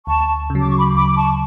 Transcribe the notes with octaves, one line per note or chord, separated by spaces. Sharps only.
D2 A5 C#6
C#3
F#3 D6
C#6
B5 D6
D2 B5 D6
D6
A5 C#6